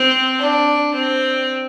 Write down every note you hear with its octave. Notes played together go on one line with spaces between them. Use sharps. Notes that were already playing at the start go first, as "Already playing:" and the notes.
Already playing: C4
D4
C4